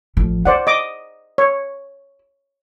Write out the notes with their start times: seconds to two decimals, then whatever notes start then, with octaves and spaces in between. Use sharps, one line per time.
0.17 A1 F3
0.45 E4 C5 D5 F#5
0.67 D#5 D6
1.38 C#5